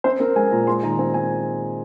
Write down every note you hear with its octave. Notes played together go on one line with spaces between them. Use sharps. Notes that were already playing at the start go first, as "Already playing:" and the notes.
C4 C5
C4 A#4
G#3 G#5
A#2 A#5
G#3 C6
D#3 A#5
C4 G#5
C4 G#5